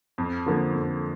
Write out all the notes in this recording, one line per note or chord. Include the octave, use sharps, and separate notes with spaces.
F2
D3 F3 A#3
F2